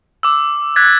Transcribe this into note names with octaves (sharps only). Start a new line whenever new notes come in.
D6 E6
D6 F#6 G#6 A6 B6